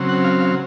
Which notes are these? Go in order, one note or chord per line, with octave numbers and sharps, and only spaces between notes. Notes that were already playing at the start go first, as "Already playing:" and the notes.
Already playing: C#3 F#3 C4
F#5
F5
F5